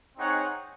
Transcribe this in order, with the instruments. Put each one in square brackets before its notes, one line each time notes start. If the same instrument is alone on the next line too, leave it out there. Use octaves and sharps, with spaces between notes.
[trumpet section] C4 D#4 G#4 C#5 F#5